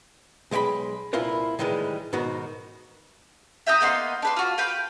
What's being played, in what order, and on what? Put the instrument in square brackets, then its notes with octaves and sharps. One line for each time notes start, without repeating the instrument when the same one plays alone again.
[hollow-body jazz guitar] B1 G#3 D5 G5 B5
C2 A#2 E4 F4 A#4 B4
A2 D#3 E3 G3 G#3
G#2 B2 D#3 F#4
[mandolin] E5 G5 A#5 D#6
A#3 B3 D#4 C6
D4 B4 C6
F4 F#4
B4 F5 G5 B5